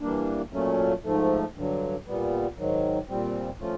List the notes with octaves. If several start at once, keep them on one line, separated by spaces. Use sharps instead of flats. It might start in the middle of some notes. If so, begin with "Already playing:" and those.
E3 G3 A#3 D4
A#2 F#3 A3 C#4
G#2 F3 A3
G2 D3 F#3
A#2 G3 B3
G#2 D#3 F#3
A#2 G3 C4
F3 A3 C#4 F4